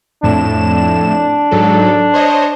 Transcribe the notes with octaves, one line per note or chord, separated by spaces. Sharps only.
F2 A2 D4 E7
G#2 F#3 A4
C5 C#5 D#5